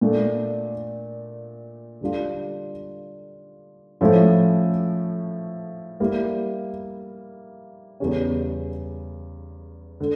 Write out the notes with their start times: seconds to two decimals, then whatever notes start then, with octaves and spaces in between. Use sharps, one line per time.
0.01 A#2 A3 D4
2.01 D3 G3 D4 F4
4.01 A2 F3 A3 C#4 E4
6.00 G3 A#3 E4
8.00 E2 C#3 G3 C#4
10.00 D3